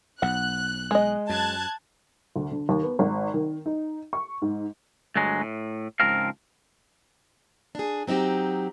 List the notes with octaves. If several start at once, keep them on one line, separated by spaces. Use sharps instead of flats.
B1 F#5 F#6
G#3 D#5
F#2 A5 F#6 G#6
D2
D3
D#2
B3
G#1
D#3
D#4
C#6
G#2
D2 G2 F#3 G#3
A2
C#2 G#2 F3 C4 A#4 F5
D4 G#4
F#3 C4 D#4 F#4 G4